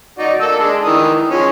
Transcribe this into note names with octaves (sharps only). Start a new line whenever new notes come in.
D#4 F#4 D5
A#3 A4 E6
G#3 D4
D#3 E3 D#6
F3 G#3 C#4